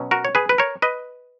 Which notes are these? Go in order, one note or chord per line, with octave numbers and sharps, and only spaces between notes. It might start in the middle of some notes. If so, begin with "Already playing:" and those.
Already playing: B2 F#3 C#4
F#4 A#4
C#5
G#4 B4
B4
A#4 C#5
B4 D#5